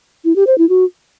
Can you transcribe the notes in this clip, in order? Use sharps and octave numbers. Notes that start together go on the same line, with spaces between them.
E4
G4
C5
E4
F#4